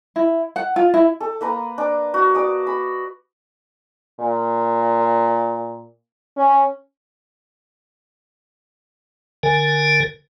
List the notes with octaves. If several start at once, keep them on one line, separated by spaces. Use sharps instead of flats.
E4
F#5
F4
E4
A4
A#3 B4 A#5
D4
F#4
D5 D#6
B5
A#2
C#4
D3 A#4 G#5